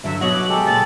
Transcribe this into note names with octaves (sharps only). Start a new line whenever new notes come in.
G2 D3 F#3 E5
B2 F#3 F#4 C#5 D#5 F#5 F#7
D6
G#3 G4 A4
C#2 A#2 A6